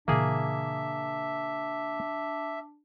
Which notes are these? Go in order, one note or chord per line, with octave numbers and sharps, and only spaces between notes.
A#2 C#3 E3 A#3 D4 G#4 E5